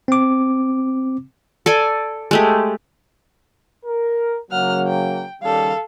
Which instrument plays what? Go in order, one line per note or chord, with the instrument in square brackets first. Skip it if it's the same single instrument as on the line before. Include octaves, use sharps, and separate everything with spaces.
[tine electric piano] C4 D6
[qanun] A4 D5 G#5
G#3 A3 G4
[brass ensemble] A#4
[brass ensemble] C#3 F#3 A#3 [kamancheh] F#5 F6
[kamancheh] G5
[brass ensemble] D#2 C#3 G3 [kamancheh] A4 F5